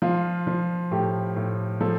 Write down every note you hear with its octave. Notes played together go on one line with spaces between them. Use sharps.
F3 F4
F3
A2 G4
A2
F3 A4